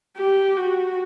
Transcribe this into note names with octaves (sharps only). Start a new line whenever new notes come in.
G4
F#4